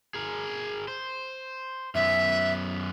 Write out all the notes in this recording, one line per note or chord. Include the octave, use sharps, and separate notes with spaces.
G#4 A#4
C5
F#2 B3 E5